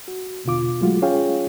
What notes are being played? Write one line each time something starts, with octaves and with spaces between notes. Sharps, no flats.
F#4
E2 B2 D3 F4 D6
F#3 G#3 A3 F4 F#4
C#4 F4 G#4 C#5 F5 G5